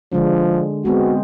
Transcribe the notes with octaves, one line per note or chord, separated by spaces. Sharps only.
D3 F3 G#3 D4
G#3 B3 C4 F#4